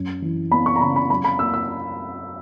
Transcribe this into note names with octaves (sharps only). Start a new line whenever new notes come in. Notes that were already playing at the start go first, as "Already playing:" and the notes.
Already playing: F#2
E3
B3 B5
C#6
A#5
C#3 B5
B5
F#2 B5
B5
A#3 E6
E6